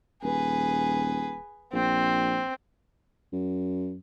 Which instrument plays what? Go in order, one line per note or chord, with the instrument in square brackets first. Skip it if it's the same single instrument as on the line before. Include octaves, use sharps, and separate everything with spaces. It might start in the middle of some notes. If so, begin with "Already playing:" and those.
[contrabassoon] D#1 [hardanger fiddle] G#4 B4
[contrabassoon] A#1 [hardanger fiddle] C4
[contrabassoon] F#2